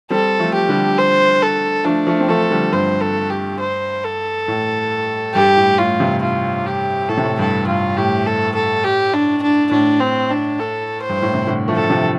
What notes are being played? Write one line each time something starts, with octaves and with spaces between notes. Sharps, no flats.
G3 C4 A4
F3 A3
G4
D3 G3
C5
A4
F3 A3 D4
F3 A3
C4
F3 A3 A4
D3 G3
G2 C5
A4
G4
C5
A4
A2
G2 G4
A2
A2 F4
G2 C3
F4
G4
A2 A4
C3
A2
G2 A4
G2 F4
A2 G4
A4
A4
G4
D4
D4
A2 D4
C4
D4
A4
C5
G2
A2
C3
A2 D3
F3 A3
A4
C3 F3